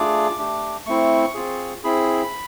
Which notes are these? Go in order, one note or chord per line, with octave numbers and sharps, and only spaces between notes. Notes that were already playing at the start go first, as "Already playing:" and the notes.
Already playing: A3 D4 F4 G#4 D6
A3 D4 G4
A3 C4 E4 C#6
C4 F4 G#4
C4 E4 G#4 B5